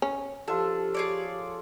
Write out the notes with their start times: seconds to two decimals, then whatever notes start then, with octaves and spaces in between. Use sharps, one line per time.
0.02 C#4
0.48 F3 D4 F4 G4 A4
0.94 G#4 C#5 D5